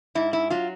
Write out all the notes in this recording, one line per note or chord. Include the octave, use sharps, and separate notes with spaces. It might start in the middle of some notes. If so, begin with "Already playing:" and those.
G#2 E4
E4
F#3 F4